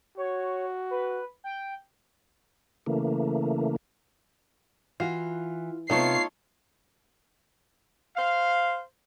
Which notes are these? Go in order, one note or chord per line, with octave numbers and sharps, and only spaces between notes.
F#4 C#5
B4
G5
C#3 E3 A3 A#3
E3 F4 F#4
C3 A3 B3 D#4 F4 C#5 C7
C5 F5